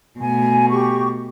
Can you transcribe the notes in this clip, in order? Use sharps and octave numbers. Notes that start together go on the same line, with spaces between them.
B2 A3 G#5
G4 C#6